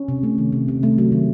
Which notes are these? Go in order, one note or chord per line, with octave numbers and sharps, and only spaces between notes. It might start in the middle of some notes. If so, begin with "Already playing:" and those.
Already playing: C#4
C3
A3
D#3
C3
C3
A3
F#3
D#3